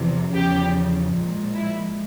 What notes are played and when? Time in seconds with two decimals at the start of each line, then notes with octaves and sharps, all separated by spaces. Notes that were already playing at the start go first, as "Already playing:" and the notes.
Already playing: E2 C3 F3
0.34 E2 C#3 F3 G4
1.14 A#2 F3 G#3
1.55 E4